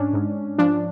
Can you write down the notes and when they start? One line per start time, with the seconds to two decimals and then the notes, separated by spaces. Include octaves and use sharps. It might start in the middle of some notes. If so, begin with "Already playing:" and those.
Already playing: G#2 C#4 D4
0.13 G#2
0.58 F3 D4